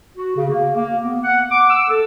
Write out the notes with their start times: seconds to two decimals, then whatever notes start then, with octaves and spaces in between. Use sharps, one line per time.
0.16 F#4
0.36 C#3
0.48 A#3
0.75 A#3
1.04 B3
1.23 F#5
1.50 D6
1.69 E6
1.89 A4